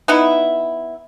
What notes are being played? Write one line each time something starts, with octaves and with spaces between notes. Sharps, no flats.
B3 D#4 E4